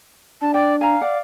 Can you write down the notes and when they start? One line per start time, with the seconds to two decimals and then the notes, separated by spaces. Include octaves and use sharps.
0.41 D4 A5
0.54 D5 G5
0.81 F5 G#5 A#5
1.02 D5 F#5